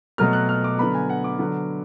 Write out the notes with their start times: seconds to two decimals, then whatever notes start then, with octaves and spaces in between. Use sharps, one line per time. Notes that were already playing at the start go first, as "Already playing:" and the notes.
0.18 B2 F#3 A3 F6
0.33 F#6
0.49 F6
0.64 D6
0.79 D3 F#3 B3 B5
0.94 G#5
1.09 F#5
1.24 D6
1.39 D3 F#3 B3